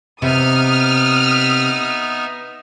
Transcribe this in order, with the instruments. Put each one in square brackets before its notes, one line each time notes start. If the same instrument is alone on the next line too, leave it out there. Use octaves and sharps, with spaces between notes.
[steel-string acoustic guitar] C3 [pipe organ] B3 D#4 E5 [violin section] D#6 F6